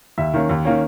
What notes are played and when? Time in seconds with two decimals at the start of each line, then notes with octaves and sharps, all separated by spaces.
0.18 D#2 E5
0.34 D#3 A#3 C#4
0.49 D#2
0.65 D#3 A#3 C#4